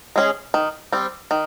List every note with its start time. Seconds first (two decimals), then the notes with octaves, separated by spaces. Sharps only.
0.16 G#3 C#4 G#4
0.54 D#3
0.92 G3 C4
1.31 D#3